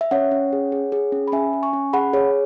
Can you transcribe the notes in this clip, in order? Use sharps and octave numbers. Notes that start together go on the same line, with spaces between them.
E5
C#4 C#5 F#5
C#4
G#4
G#4
G#4
C#4
B5
C#4 E5 G#5
C#4
G#5 C#6
C#4
G#4 F#5 B5
G#4 C#5